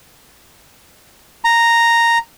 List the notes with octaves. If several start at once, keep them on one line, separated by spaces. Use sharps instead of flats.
A#5